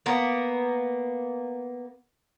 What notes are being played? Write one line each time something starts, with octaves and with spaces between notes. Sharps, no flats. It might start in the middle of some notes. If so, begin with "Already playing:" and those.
A#3 B3